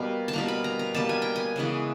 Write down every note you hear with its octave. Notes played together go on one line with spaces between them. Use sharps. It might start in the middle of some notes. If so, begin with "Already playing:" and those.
Already playing: B2 G3 A#3
A5
B2 G3 A#3 A#5
B5
A#5
A#5
B2 G3 A#3 A5
G#5
G5
G#5
C#3 E3 G#3 B3